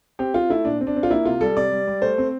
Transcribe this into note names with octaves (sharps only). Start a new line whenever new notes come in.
C4 G4
C4 F4
A3 E4
A#2 D4
C4
D4
C4
F4
A#3 E4
C3 F4
G3 A4
C3 D5
G3
G3
A3 C5
C4